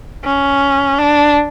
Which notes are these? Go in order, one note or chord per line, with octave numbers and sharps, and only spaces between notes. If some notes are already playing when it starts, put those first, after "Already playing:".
C#4
D4